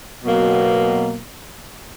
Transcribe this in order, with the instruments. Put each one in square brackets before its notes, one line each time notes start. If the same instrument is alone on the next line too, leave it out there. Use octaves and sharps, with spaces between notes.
[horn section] B2 F#3 A#3